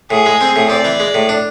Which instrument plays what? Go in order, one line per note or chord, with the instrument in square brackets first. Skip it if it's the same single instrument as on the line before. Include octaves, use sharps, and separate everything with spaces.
[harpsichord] A2 [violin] G#4
[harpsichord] G#3
C4
A2
[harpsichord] C4 [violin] D5
[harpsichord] E3
G#3
A2
D4